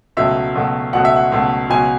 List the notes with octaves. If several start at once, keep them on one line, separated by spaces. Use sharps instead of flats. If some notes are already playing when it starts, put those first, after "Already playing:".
C#2 B2 F#3 A3 E5
C#2 B2 F#3 A3
C#2 B2 F#3 A3 F#5
E5
F#5
C#2 B2 F#3 A3
C#2 B2 F#3 G#5